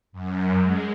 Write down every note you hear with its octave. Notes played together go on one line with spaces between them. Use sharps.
F#2
G#3